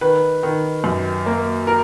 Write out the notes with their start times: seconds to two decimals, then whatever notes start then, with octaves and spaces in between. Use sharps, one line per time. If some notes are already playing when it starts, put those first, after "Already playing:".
0.01 D#3 B4
0.43 D#3
0.84 F#2
1.26 A#3
1.67 A#4